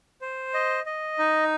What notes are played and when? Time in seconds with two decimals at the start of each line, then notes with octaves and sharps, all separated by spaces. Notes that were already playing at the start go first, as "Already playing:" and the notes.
0.21 C5
0.54 D#5
0.86 D#5
1.19 D#4